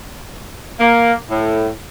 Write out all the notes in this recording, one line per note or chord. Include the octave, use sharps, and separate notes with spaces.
A#3
A2